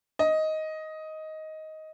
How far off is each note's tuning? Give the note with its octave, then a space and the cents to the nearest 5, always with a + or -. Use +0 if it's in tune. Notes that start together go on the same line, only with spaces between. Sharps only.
D#5 +10